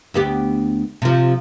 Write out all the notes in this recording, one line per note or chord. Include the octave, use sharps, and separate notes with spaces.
D2 B3 G4
C3 F3